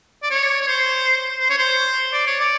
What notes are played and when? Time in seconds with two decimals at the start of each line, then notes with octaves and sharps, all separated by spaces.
0.23 D5
0.30 C#5
0.61 C#5
0.67 C5
1.40 C5
1.49 C#5
1.58 C5
2.13 D5
2.27 C#5
2.40 D5